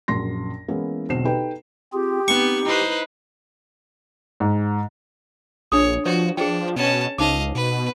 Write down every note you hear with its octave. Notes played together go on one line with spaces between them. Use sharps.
A#1 F#2 C6 A#6
E3 G#3 A#3 B3 C#4 E4
E1 B1 D3 C4 C7 E7
D#4 G4 A4 B4 G5
C4 F4 G4 G#4
B3 C4 D#4 C#6
D#4 E4 B4 C5
G#2
A#1 D4 G#4 C#5 D#6
F3 F#4 B4 C#5 D5
F3 D4 G#4 B4 G5
B2 C#4 A5
C#2 D#4 C5 D#5 F5 D6
B2 B4